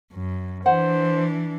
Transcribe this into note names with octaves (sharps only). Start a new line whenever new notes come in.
F#2
E3 D4 C5 F#5